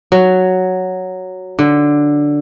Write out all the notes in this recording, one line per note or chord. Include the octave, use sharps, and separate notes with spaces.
F#3
D3